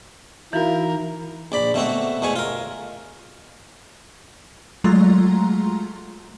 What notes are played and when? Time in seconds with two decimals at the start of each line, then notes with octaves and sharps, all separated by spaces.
0.53 E3 D#4 E4 F#4 A#4 F5
1.52 A#1 D5 B5
1.74 B2 A3 C4 F#4
2.22 E2 B2 A3 G#5 C#6
2.36 F4 A#4
4.84 F#3 G#3 A3 F4 A#5 C6